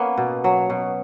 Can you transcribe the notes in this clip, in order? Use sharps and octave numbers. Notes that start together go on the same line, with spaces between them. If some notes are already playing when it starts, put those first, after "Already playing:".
Already playing: A#3 B3 C#4
B2
F#3
B2